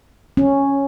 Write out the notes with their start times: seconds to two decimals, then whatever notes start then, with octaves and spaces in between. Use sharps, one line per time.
0.37 C#4